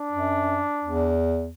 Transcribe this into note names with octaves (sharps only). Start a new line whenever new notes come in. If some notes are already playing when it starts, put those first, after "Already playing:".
Already playing: D4
F#2
E2